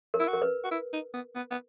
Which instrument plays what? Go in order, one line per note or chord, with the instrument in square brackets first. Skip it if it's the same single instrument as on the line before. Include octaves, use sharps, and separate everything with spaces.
[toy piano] A#4
[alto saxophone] E4
F#4
[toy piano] A#4
B4
[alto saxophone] F#4
E4
D#4
B3
B3
B3